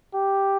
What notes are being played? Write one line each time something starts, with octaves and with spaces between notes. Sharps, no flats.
G4